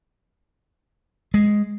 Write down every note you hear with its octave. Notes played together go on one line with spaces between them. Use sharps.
G#3